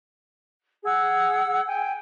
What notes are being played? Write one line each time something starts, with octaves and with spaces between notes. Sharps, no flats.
G#4 F#5 E6
G5 G#5